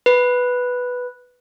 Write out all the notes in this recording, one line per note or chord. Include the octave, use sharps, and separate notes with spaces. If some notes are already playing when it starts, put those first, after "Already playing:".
B4